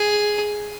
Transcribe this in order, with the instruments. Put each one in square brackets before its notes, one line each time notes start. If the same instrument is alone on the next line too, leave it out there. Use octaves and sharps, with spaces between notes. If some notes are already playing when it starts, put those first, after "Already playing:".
Already playing: [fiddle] G#4